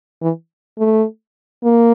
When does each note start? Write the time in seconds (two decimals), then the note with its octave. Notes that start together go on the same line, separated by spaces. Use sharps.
0.22 E3
0.79 A3
1.64 A#3